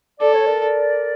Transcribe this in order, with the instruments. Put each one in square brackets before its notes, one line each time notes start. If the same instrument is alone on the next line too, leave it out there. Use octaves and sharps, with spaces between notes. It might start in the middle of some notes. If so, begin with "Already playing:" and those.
[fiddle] A4 [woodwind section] D5
[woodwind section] C#5
A#4 D5